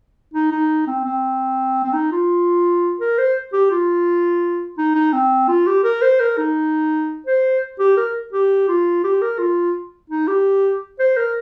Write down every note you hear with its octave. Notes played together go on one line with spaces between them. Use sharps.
D#4
D#4
C4
C4
C4
D#4
F4
A#4
C5
G4
F4
D#4
D#4
C4
F4
G4
A#4
C5
A#4
D#4
C5
G4
A#4
G4
F4
G4
A#4
F4
D#4
G4
C5
A#4